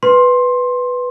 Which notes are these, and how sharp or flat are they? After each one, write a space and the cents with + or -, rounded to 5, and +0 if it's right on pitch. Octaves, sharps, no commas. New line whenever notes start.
B4 +0 C6 +15